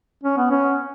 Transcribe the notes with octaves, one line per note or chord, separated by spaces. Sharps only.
C#4
B3
C#4